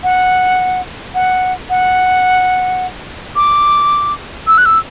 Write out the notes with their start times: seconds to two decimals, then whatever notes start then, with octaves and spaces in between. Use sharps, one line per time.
0.03 F#5
1.14 F#5
1.70 F#5
3.36 D6
4.47 E6
4.58 F#6
4.66 E6